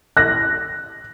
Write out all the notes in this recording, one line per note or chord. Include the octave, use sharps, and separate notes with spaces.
F#6 A#6